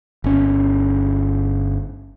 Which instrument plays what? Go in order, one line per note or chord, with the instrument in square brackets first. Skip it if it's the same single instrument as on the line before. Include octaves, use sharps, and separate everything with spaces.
[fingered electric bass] G1 C#4